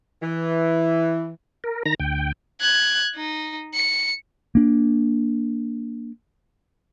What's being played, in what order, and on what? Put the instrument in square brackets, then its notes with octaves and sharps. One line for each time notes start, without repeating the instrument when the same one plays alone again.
[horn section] E3
[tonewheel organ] A#4
D#3 A#5 A#6
D2 G5
[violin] F#6 G#6
D#4
C#7
[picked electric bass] A#3 D4